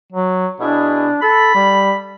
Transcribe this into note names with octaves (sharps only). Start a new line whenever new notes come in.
F#3
B2 D4 E4 G#4
A4 B5
G3